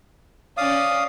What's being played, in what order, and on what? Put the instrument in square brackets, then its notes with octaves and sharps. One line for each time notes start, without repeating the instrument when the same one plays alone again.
[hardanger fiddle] C#4 D5 [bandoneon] F5 D#6